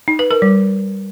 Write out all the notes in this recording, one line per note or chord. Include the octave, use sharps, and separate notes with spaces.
D#4
B4
A#4
G3